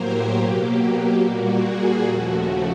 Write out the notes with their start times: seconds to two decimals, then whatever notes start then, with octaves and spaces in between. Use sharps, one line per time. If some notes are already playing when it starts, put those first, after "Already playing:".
Already playing: A2 F#3 A#3 G4 A#4 C5
0.35 B2 F#3 A#3
1.20 A#2 G3 A#3 F#4
1.62 F#4 G#4
2.05 D#2 C#3 F3 A3 F#4